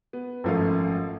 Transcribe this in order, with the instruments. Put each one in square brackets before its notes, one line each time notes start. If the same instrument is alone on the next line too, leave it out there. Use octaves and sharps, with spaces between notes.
[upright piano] B3
G#1 F#2 F3 A3 A4 F5